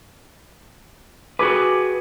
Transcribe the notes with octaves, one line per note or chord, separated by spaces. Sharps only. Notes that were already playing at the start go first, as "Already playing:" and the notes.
F#4 G#4 B4 D6